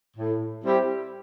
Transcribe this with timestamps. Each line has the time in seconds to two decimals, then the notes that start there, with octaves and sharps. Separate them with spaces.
0.17 A2
0.63 G3 C4 E4 G4